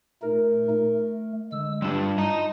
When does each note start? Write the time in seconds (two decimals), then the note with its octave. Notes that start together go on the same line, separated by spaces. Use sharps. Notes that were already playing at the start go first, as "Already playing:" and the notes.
0.23 A#2 A3 D#4 A#4
0.70 A3
1.52 D3 G#3 E6
1.82 G3 D4 F4 A5
2.18 D#4 D#5 A#5